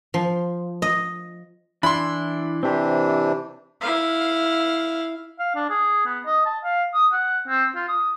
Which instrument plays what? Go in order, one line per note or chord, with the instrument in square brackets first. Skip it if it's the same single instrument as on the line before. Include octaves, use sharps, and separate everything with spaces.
[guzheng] F3
D#5
[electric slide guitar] E3 D4 E4 [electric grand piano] B5 C6
[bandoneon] C3 E3 D4 [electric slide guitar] C4 G4
[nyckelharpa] E4 F5
[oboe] F5
D4
G#4
B3
D#5
A5
F5
D#6
F#5
C4
F4
D#6